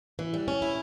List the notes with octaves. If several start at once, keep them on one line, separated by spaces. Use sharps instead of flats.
E3
G3
C#4
E4